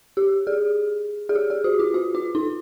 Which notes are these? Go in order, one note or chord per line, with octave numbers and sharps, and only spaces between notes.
G4
G#4
G#4
G4
G#4
F#4
F4
F#4
F4
D#4